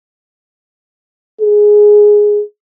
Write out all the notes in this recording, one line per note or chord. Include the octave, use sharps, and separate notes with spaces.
G#4